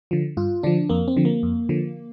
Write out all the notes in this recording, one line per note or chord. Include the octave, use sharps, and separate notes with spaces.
D3 F3
G2 F4
D3 F3 D4
F2 A#3
C4
D3 F3
A#3
F2
D3 F3